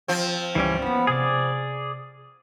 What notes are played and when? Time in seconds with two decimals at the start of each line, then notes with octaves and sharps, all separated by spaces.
0.08 F3 C4
0.55 C#2 G2 E3 G3 C#4
0.82 A#3 B3 C#4
1.07 C3 G#4 D5